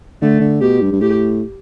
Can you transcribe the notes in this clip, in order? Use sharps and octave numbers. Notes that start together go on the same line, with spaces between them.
D3 A3
D3
B2 G4
G2
G2
A2 G4